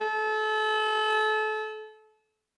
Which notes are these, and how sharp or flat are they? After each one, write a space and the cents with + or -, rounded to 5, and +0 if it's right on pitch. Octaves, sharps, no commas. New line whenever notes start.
A4 -30